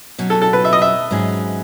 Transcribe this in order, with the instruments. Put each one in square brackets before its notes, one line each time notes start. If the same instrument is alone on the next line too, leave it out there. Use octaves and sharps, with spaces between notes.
[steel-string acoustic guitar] B2 F#3 C#4
[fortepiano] A4
A4
B4
E5
D#5
E5
[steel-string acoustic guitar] G#2 F#3 C#4 G#4